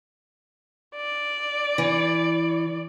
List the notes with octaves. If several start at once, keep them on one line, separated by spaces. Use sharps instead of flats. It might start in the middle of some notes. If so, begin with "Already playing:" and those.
D5
E3